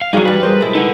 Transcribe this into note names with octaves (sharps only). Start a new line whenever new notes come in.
F5
G2 F#3 D#4 F#4 G#4 C#5 F5
E3 G3 B4
G#4 A#4 C5
B2 G#3 E4
D#4 A4 B4 F#5